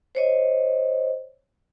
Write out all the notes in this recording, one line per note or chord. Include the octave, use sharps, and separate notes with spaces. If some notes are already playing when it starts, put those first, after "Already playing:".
C5 C#5 D#5